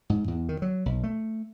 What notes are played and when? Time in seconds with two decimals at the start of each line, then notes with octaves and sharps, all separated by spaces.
0.10 G#2
0.28 E2
0.49 D#3
0.62 F#3
0.86 B1
1.03 A3